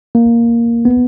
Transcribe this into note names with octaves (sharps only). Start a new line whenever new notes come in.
A#3
B3